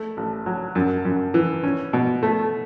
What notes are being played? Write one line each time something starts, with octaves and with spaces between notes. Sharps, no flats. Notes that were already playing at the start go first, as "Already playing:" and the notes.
Already playing: A3
A1
F#3
F#2
F#2
E3
C#4
B2
A3